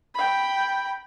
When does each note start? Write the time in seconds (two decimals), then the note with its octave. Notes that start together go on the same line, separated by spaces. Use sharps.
0.15 G5 B5